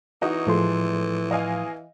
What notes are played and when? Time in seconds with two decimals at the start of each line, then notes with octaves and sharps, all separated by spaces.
0.22 E3 D#4 F#4
0.47 A2 F3 G#3 A3 C6
1.31 D#5 F5 G#5